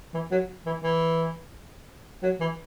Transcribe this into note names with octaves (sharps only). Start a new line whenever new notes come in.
E3
F#3
E3
E3
F#3
E3